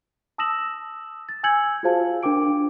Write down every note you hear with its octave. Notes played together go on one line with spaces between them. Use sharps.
A5 D#6 E6 A#6 E7 F#7
A6
G#5 E6 G6 G#6 C#7 F#7
F4 F#4 G#4 C5 F5 A5
D4 A#4 G5 D6 D7